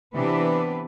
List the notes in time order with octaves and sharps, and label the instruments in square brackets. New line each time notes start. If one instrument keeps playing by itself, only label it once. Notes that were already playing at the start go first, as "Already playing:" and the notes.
[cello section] C3 E3 B3 D4 G4 B4